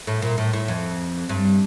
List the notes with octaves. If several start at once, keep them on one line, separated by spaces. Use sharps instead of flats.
A2
A#2
A2
A2
F2
G2